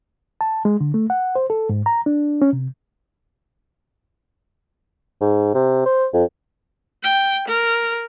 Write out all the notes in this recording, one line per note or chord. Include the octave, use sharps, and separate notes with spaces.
A5
G#3
D3
A3
F#5
C5
A4
G#2
A#5
D4
C#4
C3
G#2
C3
C5
F2
G5
A#4